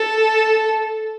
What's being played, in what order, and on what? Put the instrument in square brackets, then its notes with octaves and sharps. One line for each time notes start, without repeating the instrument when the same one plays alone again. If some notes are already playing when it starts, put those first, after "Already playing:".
Already playing: [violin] A4